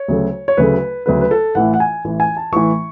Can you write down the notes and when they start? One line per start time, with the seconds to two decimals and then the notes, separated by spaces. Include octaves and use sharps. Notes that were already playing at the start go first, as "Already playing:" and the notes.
Already playing: C#5
0.08 D2 C#3 F#3 A3
0.48 C#5
0.57 D2 C#3 F#3 A3 B4
1.06 D2 C#3 F#3 A3 B4
1.21 B4
1.31 A4
1.55 A1 A2 E3 F#5
1.74 F#5
1.80 G#5
2.05 A1 A2 E3
2.20 G#5
2.37 A5
2.52 A1 A2 E3 C#6